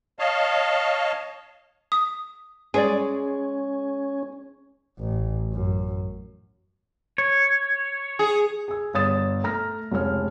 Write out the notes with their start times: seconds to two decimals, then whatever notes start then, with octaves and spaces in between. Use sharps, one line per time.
0.19 C#5 D#5 F5 A5
1.92 D#6
2.74 G#3 C#4 G#4 C#5 D5
4.99 A1
5.52 F#2
7.18 C#5
8.19 G#4
8.68 G#4 E6
8.94 G1 C#5 D#6 A6 E7
9.44 A3 A#5 F6 A#6
9.91 F1 C#2 C#5 F6